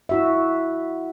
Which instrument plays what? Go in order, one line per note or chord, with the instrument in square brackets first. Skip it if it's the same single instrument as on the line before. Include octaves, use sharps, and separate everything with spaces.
[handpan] E4 F#4 E5